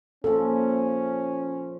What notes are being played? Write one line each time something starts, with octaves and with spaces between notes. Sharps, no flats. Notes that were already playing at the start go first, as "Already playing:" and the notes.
A#2 C#3 F3 C#4 A4